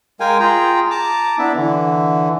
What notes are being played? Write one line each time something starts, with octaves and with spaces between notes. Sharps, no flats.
G#3 A#4 F5 G5 G#5
F4 G#4 G5 A#5
A5 A#5 D6
B3 D4 E4 E5
D3 E3